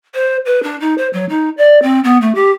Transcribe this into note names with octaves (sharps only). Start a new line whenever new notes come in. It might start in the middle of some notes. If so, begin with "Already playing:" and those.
C5
B4
D4
D#4
C5
F#3
D#4
D5
C4
B3
A3
G4